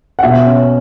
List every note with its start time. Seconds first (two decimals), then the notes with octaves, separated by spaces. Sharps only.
0.19 F#5
0.23 B2 E5
0.45 C#4